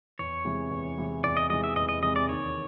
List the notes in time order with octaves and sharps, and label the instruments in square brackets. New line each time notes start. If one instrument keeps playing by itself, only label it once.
[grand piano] E2 [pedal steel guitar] C#5
[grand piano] C3 E3 G#3
E2
C3 E3 G#3
[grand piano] E2 [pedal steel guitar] D5
[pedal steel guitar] D#5
[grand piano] C3 E3 G#3 [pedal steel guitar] D#5
[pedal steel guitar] E5
[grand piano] E2 [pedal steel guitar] D#5
[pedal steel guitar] D#5
[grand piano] C3 E3 G#3 [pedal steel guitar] D#5
[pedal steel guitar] D5
[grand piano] D#2 [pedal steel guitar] C#5